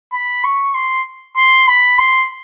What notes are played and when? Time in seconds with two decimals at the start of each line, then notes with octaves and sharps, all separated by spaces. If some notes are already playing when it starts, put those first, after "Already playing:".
0.13 B5
0.44 C#6
0.75 C6
1.37 C6
1.68 B5
1.98 C6